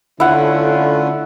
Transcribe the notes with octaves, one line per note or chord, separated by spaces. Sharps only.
D3 A3 C#4 E4 F4 F#5